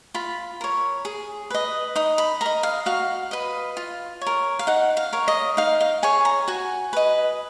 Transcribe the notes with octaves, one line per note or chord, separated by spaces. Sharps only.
F4 B5
A#4 C#5
G#4
B4 D#5
D#4 D#6
B5
A#4 D#5 A#5
F5
F#4 F5
B4 D#5
F4
C#5
A#4
F5
D#4 F#5
F5
A#4 C#5
D#5
D#4 F5
F5
G#4 C#5 G#5
A#5
F#4 G#5
B4 D#5